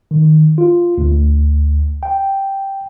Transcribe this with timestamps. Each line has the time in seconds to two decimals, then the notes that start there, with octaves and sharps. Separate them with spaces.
0.11 D#3
0.58 F4
0.98 D2
2.03 G5